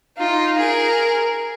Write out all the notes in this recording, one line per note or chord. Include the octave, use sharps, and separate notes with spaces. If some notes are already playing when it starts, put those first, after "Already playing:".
D#4 F4
G#4 A#4